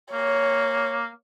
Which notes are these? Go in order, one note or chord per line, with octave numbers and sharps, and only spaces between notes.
A#3 C#5